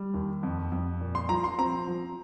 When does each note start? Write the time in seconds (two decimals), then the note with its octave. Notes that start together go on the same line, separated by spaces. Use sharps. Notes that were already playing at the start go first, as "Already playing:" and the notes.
Already playing: G3
0.14 D#2
0.43 F2
0.72 F2
1.01 A#2
1.15 C6
1.29 F3 A#5
1.44 C6
1.58 C4 A#5
1.88 F3